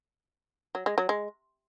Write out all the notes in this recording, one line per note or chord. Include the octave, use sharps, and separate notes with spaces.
F#3
G#3
F#3
G#3